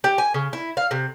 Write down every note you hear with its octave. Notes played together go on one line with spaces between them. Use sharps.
G4
G#5
C#3
E4
F5
C3